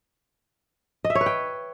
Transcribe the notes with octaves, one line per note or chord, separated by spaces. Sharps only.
D#5
E5
C#5
B4
G5